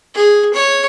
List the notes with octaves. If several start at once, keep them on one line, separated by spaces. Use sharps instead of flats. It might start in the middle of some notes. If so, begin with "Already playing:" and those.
G#4
C#5